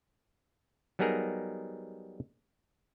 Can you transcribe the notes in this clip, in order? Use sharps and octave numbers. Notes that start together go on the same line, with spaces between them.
F#3 G3 B3 D#4 G#4 A#4